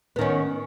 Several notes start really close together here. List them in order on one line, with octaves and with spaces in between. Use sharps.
B3 D#3 C#4